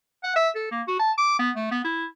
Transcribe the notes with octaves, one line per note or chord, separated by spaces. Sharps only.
F#5
E5
A4
A#3
F#4
A5
D6
B3
A3
B3
E4